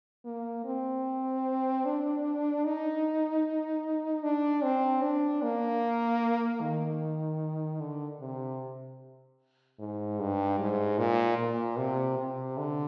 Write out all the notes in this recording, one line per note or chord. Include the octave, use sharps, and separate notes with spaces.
A#3
C4
D4
D#4
D4
C4
D4
A#3
D#3
D3
C3
G#2
G2
G#2
A#2
A#2
C3
C3
D3